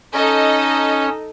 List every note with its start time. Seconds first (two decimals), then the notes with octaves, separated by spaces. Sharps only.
0.14 C#4 D#4 A4 D#5